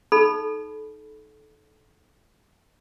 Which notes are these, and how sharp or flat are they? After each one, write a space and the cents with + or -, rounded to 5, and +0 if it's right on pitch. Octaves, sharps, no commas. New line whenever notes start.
D#4 +0 A4 -25 B5 +0